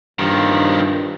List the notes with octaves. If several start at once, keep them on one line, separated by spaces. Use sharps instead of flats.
G2 D#3 F3